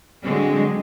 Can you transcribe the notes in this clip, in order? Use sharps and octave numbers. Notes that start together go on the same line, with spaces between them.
D3 F#3 G#3 C4